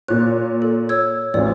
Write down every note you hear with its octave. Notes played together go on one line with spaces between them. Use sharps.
A#2 C#5 F#6
A4
C#5 E6 G#6
A1 D2 D5